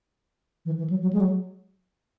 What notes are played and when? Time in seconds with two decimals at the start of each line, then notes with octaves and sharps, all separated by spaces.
0.65 E3
0.78 E3
0.90 F#3
1.01 F#3
1.13 G#3
1.20 F#3